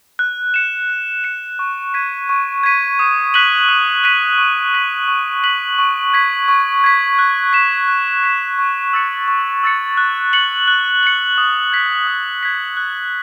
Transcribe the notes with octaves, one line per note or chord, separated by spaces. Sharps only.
F#6
C#7 E7
F#6
C#7 E7
C#6
G#6 B6 D#7
C#6
G#6 B6 D#7
D#6
F#6 B6 D#7 F#7
D#6
F#6 B6 D#7 F#7
C#6
F#6 B6 F#7
C#6
F#6 B6 F#7
C#6
G#6 B6
C#6
G#6 B6
F#6
B6 E7
F#6
B6 E7
C#6
E6 A6 C#7
C#6
E6 A6 C#7
F#6
C#7 F#7
F#6
C#7 F#7
D#6
G#6 B6
D#6
G#6 B6
F#6